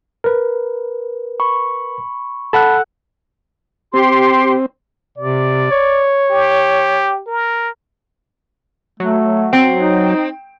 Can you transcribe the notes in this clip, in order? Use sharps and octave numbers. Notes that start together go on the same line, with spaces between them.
A#4 B4
B5 C#6
A4 F#5 A5 B5 F#6
C4 G4 C6
C3 D5
C#5
G4
A#4
F#3 A3
C4
D#4